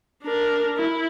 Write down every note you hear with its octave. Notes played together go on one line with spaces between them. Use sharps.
D4 A#4
E4